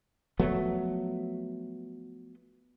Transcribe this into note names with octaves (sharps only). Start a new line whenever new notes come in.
F3 F#3 A3 B3